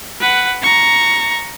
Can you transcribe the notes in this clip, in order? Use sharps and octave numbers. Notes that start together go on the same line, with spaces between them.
B4 F#5
A#5 C#6